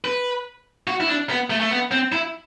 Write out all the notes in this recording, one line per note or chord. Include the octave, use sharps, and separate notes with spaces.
B4
F#4
E4
D4
B3
A3
A3
B3
C4
E4